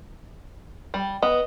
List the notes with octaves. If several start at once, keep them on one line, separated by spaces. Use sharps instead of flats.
G3
B3 D#5